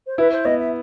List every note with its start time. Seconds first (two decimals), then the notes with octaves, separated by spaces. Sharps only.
0.07 C5
0.18 E4 B4
0.32 C5
0.45 B3 D#5
0.58 E5